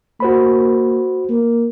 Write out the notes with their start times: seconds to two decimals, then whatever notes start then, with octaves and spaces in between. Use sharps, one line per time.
0.20 A#3 F#4 C5 B5
1.29 A#3